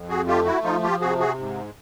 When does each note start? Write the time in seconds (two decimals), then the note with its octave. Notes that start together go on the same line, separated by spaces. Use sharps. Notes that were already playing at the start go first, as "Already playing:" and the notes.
Already playing: F2
0.09 F#4 G#4
0.27 A3 F4 G4
0.45 E4 F#4
0.63 F3 D#4 F4
0.83 F4 G4
1.01 C3 F#4 G#4
1.19 F#4 G#4
1.38 G#2